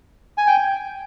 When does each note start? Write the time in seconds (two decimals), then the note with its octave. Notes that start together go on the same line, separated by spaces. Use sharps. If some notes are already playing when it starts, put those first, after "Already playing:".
0.38 G#5
0.47 G5